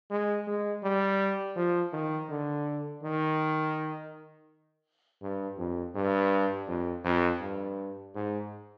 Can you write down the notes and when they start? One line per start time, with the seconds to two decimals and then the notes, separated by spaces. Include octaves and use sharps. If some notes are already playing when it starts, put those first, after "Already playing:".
0.11 G#3
0.47 G#3
0.83 G3
1.56 F3
1.93 D#3
2.30 D3
3.03 D#3
5.22 G2
5.58 F2
5.95 G2
6.68 F2
7.04 F2
7.41 G2
8.15 G#2